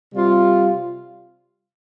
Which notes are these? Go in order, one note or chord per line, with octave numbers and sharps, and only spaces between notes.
C3 G3 F4